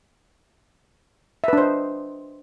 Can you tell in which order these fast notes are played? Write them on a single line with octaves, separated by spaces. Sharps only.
E5 B4 D4 C5 D#5